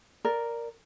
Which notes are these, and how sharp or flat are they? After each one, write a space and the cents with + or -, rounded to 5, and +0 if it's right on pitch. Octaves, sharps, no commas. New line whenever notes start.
A#4 +0 D5 +0